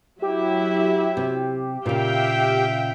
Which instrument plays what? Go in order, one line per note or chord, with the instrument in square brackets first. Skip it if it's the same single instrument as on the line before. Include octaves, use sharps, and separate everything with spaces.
[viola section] F#3 E4 E5 [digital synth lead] G4
[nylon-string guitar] C3
[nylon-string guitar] A#2 C#3 [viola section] E5 F5 G5